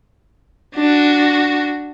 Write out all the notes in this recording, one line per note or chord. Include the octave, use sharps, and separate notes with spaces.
D4 F#4